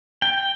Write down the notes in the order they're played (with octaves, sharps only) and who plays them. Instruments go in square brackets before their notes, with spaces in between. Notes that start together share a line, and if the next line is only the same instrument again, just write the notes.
[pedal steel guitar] G5